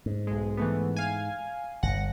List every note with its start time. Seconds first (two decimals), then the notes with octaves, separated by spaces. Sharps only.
0.06 G#2
0.27 B1 G#3
0.57 E3 A3 B3
0.97 F5 G#5
1.83 G1 F#5 A#6